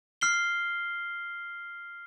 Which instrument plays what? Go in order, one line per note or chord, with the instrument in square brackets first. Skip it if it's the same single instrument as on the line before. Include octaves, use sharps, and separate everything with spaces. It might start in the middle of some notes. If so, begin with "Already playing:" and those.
[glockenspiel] F6 C7 G7